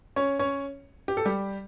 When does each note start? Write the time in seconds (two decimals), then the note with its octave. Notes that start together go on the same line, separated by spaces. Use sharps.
0.16 C#4 C#5
0.39 C#4 C#5
1.08 G4
1.17 A4
1.26 G3 G4